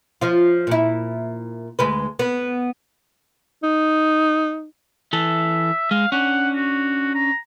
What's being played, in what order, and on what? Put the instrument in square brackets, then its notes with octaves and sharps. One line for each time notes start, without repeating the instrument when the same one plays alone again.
[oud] F3 F4
A#2 E4
D2 G#3 B4
B3
[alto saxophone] D#4
[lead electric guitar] E3 A4 [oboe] E5
[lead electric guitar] G#3 [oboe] F5
[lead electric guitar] C#4 D4 [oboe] F#5
[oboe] F#4
A#5